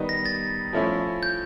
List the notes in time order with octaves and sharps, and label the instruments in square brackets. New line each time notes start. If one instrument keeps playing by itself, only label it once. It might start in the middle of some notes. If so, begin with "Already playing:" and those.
Already playing: [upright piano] D#3 G3 B3 D#4
[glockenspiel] A#6
A6
[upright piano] F3 A3 C#4 E4
[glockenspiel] G6